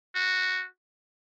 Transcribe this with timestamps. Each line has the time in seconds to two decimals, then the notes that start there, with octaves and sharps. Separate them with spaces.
0.15 F#4